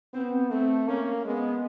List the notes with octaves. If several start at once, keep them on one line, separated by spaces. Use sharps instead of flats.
B3 C4
A3 C4
A#3 C#4
G#3 B3